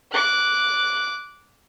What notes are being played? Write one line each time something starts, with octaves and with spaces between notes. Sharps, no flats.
D6 F#6